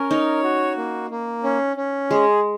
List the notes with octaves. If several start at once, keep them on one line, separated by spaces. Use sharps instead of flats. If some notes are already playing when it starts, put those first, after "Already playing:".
Already playing: C#4 A#4
D#4 C#5
F#4
A#3
A#3
C#4
C#4
G#3 G#4